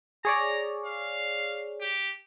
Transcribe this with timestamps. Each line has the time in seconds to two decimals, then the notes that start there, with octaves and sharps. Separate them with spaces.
0.25 G#4 C#5 D5 A#5
0.83 F5
1.81 G4